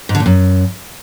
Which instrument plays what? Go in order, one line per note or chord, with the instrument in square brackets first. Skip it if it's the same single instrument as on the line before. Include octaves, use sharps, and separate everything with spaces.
[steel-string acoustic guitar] G#2
D3
A#2
F#2